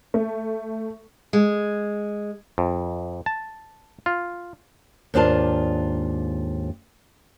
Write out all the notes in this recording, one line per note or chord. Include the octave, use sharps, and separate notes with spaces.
A3
G#3
F2
A5
F4
D#2 G#2 D4 F4 A5